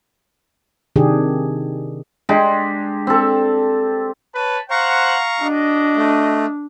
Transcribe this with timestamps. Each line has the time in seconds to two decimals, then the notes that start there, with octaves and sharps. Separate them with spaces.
0.96 C3 D#3 D4 G4 G#4
2.29 G#3 D4 G4
3.07 C4 A4
4.35 B4 C#5 A5
4.70 C5 F5 F#5 A#5 C#6
5.41 D4 F#4 D#5
5.96 A3